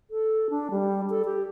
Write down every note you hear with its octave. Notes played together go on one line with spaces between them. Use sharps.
A4
D4
G3
A4
G4